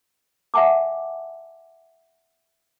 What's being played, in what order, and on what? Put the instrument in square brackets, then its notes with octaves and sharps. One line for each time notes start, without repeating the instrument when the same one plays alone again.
[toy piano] E5 F#5 G#5 A5 D6